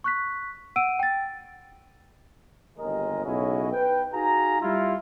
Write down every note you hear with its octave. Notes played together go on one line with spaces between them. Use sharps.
C#6 F#6 B6
F#5 E6 D7 D#7
G5 A6
G1 D#2 G#3 A#4 D#5
B1 C#3 C#4 E4 F#4 D#5
B4 G5
D#4 F#4 G#4 F5 A#5
G3 E4 F4